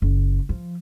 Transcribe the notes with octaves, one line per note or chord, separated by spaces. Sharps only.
F#1
F3